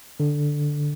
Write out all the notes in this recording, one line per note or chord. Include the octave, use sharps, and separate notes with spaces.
D3